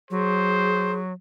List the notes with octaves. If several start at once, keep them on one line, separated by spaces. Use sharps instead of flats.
F#3 G#4 C5